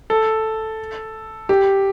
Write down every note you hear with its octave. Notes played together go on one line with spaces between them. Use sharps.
A4
G4